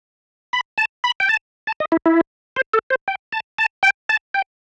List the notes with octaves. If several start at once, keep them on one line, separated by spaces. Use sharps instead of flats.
B5
A5
B5
G5
A5
A5
D#5
E4
E4
C5
A4
C5
G5
A5
A5
G5
A5
G5